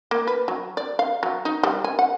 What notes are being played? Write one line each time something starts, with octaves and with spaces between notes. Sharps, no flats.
A#3
B4
F#3
D5
F5
F#3
D#4
G3
G#5
F#5